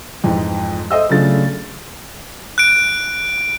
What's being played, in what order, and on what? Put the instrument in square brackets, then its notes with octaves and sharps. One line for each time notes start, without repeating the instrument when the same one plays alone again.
[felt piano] F2 G#2 E3
A4 C5 D#5 E5 E6
C#3 F#3 A3 D4 F4 A6
[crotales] F#6 D7